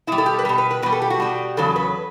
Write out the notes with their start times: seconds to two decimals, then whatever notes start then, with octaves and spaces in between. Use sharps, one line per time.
0.07 B2 G3 E4
0.18 A4
0.26 G4
0.39 B4
0.45 B2 G3 A4
0.58 B4
0.71 B4
0.82 B2 G3 B4
0.92 A4
1.02 G4
1.10 F#4
1.20 B2 G3
1.57 E2 C#3 F#3 A4
1.76 B4